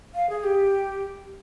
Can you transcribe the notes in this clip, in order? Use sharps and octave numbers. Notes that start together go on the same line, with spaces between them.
F5
G#4
G4